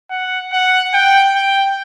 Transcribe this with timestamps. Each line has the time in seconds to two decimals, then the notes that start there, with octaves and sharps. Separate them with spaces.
0.10 F#5
0.53 F#5
0.94 G5
1.35 G5